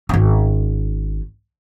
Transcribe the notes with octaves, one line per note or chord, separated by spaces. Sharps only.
G#1 C#4